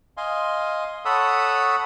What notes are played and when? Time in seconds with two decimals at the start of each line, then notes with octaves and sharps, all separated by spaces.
0.17 D#5 F5 G#5 C6
1.05 A4 C#5 F#5 B5 D#6 E6